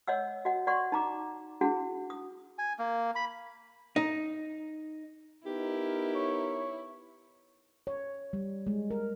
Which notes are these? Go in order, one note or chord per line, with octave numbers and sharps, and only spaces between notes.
C#5 D#5 F#5 E6
F#4 D#5 F#5
D5 F#5 C6 C#6
D#4 A#5 D6
D4 E4 F#4 G#4 F#5
D#6
G#5
A#3
B5
D#4
B3 D#4 E4 G4 A#4
C#5
C#5
G3
G#3
A#4